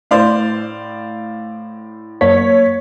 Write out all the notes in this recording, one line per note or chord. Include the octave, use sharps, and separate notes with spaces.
A2 C5 D5 F5
F#2 A#3 C#5 B6